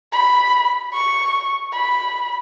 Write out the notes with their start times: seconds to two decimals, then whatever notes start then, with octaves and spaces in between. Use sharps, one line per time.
0.12 B5
0.93 C#6
1.73 B5